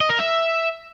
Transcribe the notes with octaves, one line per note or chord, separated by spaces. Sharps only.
D#5
A#4
E5